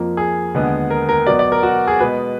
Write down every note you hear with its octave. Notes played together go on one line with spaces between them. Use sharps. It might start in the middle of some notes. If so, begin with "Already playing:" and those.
Already playing: F2 F3 A#3
G#4
D#2 D3 G#3 B3
A#4
A#4
B2 F#3 B3 D5
D5
A#4
F#4
G#4
B2 G#3 B3 B4